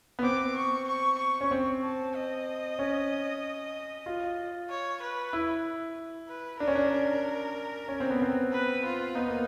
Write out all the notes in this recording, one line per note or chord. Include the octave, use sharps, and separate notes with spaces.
B3
C4 D6
C#6
C#6
C#6
C#4
C4
A5
D#5
C#4
F4
C#5
B4
E4
B4
D4 A#4
C#4
D4
C#4
C4
B3
C4
B4
F4
B3 D#4
A#3